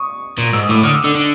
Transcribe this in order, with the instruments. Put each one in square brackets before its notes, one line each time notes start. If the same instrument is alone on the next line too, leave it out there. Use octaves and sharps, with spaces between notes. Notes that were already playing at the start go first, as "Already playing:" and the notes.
Already playing: [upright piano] C#6 D#6
[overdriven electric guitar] A#2
[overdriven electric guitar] G#2 [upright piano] E6
[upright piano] D#6
[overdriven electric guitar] A2 [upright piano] D6 E6
[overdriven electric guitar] D3 [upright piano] D#6 F6
[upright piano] D6 E6
[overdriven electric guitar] D3 [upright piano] D6 E6
[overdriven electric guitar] D3